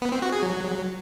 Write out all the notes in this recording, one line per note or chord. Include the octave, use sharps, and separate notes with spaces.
B3
C4
F#4
G#4
F#3